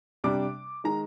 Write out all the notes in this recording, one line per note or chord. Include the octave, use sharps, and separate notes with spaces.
C3 G3 D4 D6
D#3 G#3 A#5